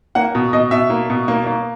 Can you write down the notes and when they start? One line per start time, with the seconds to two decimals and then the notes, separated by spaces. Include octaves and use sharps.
0.15 A#3 F#5
0.35 B2
0.53 B2 D#5
0.71 B2 E5
0.90 A#3
1.10 B2
1.28 A#3
1.46 A#3